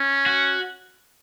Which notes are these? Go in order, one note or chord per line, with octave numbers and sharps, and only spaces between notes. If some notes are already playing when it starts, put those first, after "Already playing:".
Already playing: C#4
F#4